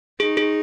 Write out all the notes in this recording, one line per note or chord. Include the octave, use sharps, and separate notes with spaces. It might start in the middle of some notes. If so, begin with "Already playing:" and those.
D#4 G#4
G#4